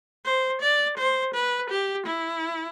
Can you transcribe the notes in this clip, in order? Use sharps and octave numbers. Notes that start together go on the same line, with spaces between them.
C5
D5
C5
B4
G4
E4